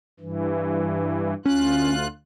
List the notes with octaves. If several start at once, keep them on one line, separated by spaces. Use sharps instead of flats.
G2 E3
D2 C#4 F4 F#6